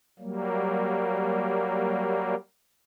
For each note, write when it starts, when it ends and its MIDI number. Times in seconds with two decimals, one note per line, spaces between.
0.19 2.35 54
0.19 2.35 55
0.19 2.35 58